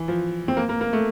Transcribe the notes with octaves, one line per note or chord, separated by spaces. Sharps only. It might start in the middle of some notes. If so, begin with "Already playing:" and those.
Already playing: E3
F3
C4
A#3
A#3
A#3
A3